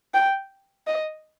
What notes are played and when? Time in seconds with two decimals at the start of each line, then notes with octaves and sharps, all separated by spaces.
0.14 G5
0.87 D#5